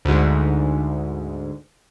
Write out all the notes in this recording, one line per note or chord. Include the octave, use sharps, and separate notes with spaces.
D2 G#2